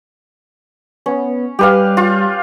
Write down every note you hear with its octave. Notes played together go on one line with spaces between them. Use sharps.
B3 C#4
G3 G4 B4 F5
F4